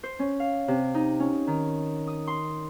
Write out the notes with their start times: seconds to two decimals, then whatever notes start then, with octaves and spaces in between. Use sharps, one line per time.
0.03 C5
0.19 C#4
0.40 F5
0.68 C3
0.94 D#4
1.20 C#4
1.47 D#3
2.07 D#6
2.27 C6